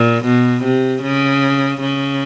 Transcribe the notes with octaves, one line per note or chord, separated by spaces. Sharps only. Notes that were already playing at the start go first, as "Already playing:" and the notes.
Already playing: A#2
B2
C3
C#3
C#3